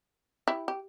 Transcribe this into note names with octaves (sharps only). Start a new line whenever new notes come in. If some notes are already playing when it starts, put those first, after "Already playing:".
E4 G4
G4